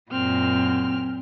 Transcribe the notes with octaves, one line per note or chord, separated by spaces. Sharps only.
F#2 A#2 C4 F6